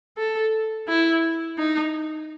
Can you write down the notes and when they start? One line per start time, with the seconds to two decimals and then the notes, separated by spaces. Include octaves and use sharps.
0.18 A4
0.88 E4
1.58 D#4